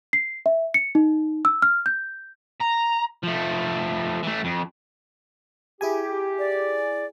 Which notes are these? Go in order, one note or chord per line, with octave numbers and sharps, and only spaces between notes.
C7
E5
C#7
D#4
E6
F6
G6
A#5
F3 A3
E3 A3
F2
E4 G4 G#4 G#5
D5